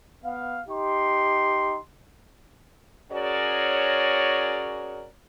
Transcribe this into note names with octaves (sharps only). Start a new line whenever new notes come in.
B3 F5
D#4 G4 C6
C#4 F#4 G#4 A#4 C#5 D5